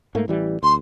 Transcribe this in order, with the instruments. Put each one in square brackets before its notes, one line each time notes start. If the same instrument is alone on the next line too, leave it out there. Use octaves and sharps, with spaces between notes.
[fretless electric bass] G#2 A3 A#3
A1 E3 G3
[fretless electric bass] D2 [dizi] C6